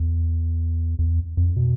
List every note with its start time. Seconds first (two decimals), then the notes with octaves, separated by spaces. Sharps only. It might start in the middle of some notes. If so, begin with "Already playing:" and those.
Already playing: E2
0.99 E2
1.37 F2
1.56 B2